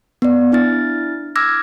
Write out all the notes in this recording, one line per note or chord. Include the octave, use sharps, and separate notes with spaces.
B3 D5
D4 E4 F6 A6
D6 E6 F6 G#6 A#6